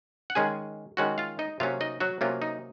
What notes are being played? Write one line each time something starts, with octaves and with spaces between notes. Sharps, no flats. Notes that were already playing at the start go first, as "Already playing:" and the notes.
F#5
D#3 G#3 C#4 G#4 G#5
D#3 G#3 C#4 F#4 F#5
F4 F5
D#4 D#5
C3 F#3 A#3 C#4 F4 F5
D#4 D#5
F#3 F#4
C3 F#3 A#3 C#4 F4
D#4